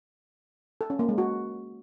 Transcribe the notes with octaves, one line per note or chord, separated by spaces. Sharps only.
A4
C#4
A#3
G#3
F#4